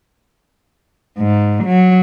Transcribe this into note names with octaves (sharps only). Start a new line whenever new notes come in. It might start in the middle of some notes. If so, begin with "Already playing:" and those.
G#2
F#3